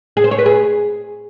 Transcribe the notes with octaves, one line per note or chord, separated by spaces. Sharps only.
G#4
C5
C#5
B4
G#4